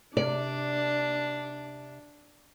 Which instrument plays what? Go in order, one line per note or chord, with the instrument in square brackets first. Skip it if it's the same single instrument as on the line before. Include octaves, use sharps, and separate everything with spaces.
[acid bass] C3 [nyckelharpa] D4 [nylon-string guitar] D5